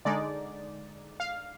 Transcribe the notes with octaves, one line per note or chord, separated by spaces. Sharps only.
D3 G#3 D#4 D5
F5